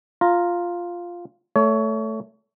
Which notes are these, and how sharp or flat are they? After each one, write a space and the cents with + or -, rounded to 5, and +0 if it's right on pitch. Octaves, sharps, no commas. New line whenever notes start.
F4 +0 A#5 +0
A3 +0 C#5 +25